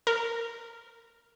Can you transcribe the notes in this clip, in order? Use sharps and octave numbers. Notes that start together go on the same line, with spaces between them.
A#4